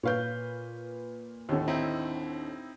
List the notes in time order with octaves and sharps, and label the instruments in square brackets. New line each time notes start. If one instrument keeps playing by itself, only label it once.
[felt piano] A#2 B4 G6 [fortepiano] C#5 F5
[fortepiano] D#2 A2 D3
[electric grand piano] C4 D#4 E4